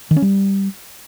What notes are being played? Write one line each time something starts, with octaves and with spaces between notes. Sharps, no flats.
D#3
C#4
G3